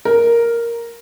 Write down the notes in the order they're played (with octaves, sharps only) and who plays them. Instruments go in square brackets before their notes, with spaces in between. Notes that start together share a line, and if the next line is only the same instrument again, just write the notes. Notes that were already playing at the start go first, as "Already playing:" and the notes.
[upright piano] A#4